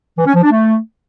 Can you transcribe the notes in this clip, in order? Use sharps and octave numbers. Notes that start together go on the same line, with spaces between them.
E3
C#4
F3
D4
A3